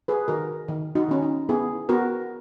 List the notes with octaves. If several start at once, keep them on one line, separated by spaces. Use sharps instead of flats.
G#4 B4
D#3 F#4 A#4
D#3
D#4 F#4
D#3 C#4
D#4
B3 E4 G#4
B3 F#4 A#4